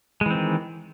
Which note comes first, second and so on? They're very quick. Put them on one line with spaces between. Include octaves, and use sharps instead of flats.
G#3 E3 C4 D#3